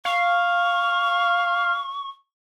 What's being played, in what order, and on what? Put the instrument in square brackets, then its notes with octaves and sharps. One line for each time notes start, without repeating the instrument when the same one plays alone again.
[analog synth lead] F5 [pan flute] C#6